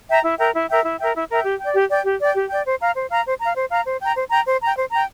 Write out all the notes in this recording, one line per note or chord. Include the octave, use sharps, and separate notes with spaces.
E5 G5 A#5
E4
A#4 E5 G5
E4
A#4 E5 G5
E4
A#4 E5 G5
E4
A#4 E5 G5
G4
D5 G5
G4
D5 G5
G4
D5 G5
G4
D5 G5
C5
F5 A#5
C5
F5 A#5
C5
F5 A#5
C5
F5 A#5
C5
G5 A#5
C5
G5 A#5
C5
G5 A#5
C5
G5 A#5